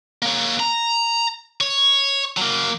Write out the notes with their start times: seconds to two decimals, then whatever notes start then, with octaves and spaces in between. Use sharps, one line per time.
0.22 A#3 C#5
0.60 A#5
1.61 C#5
2.37 F#3 A#3